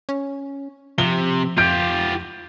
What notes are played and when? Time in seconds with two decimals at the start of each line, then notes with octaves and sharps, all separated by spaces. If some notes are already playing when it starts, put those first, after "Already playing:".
0.09 C#4
0.98 C3 F3 G7
1.58 F2 F4 G4 G6 D7